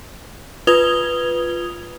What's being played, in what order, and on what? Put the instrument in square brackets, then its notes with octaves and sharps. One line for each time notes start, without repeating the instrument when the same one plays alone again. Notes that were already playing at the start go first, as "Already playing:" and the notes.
[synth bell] F4 B4 D#6 G#6 F7 G7